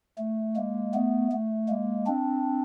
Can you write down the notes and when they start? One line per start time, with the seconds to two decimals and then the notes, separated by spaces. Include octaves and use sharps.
0.18 A3
0.56 G#3 A#3
0.94 A3 B3
1.32 A3
1.68 G#3 A#3
2.07 C4 D4